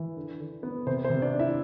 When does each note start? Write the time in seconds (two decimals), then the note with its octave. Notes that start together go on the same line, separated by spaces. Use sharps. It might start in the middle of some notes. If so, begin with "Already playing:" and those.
Already playing: E3
0.16 D3
0.40 D3
0.63 B3
0.87 C3 C5
1.04 C5
1.10 C3
1.22 D4 D5
1.33 D4
1.39 E4 E5